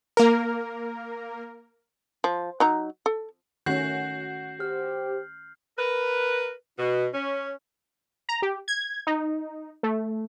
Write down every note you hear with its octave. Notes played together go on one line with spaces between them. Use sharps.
A#3 A#4
F3
F#3 D#4 A#5
A4
D#3 A3 C#4 F#4 G6 C7 F#7
G4 C5 F6
A#4 B4
B2
C#4
A#5
G4
G#6
D#4
A3